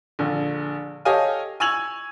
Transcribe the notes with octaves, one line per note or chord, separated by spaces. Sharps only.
A#1 D3
G4 A4 C#5 D#5 F5 G#5
G#5 C#6 E6 G#6 F7 F#7